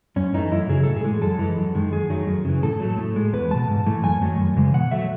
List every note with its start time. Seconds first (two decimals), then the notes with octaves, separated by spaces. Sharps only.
0.16 F#2 C#4
0.34 E3 A3 D#4
0.51 F#2 E4
0.69 C#3 F#3 G#4
0.83 A2 A4
0.96 G#4
1.04 E3 G#3
1.22 F#2 A4
1.39 E3 G#3
1.57 F#2
1.75 D#3 G#3
1.92 F#2 G#4
2.10 D#3 F#3 A3
2.27 F#2
2.45 C#3 E3
2.63 A2 A4
2.80 F#3 A3
2.98 A2
3.16 G#3
3.33 E2 B4
3.51 B2 G#3 A5
3.68 G#2
3.86 E3 A3
4.04 F#2 G#5
4.21 D#3 F#3 A3
4.39 F#2
4.56 C#3 E3 G#3
4.74 B2 F#5
4.91 F#3 A3 E5